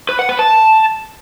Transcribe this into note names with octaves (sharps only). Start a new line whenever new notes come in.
B4
F#5
B4
A5